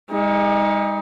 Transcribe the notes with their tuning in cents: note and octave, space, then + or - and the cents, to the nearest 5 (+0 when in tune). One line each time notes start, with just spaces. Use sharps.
G#3 -45 D#4 +25